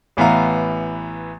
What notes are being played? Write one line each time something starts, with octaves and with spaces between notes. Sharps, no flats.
A1 E3 B3 F5 A#5